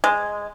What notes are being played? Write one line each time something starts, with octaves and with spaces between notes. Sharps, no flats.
G#3